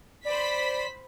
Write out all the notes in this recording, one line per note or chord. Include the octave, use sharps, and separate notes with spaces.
C5 D5 B5 B6